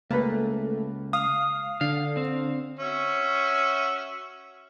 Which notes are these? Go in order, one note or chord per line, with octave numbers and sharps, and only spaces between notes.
C#2 A3 A#3 B4
F5 D#6
D3 F5
C4
C#4 F#4 E5